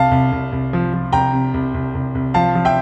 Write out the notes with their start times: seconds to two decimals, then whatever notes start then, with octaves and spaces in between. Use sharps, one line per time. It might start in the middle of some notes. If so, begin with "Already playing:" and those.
Already playing: C2 F5 A5
0.11 C2
0.32 C2
0.52 C2
0.73 F3
0.93 F3
1.12 C2 G5 A#5
1.33 C3
1.54 C2
1.74 C2
1.95 C2
2.15 C2
2.34 F3 F5 A5
2.55 F3
2.65 E5 G5